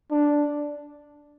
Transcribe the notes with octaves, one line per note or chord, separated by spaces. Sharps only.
D4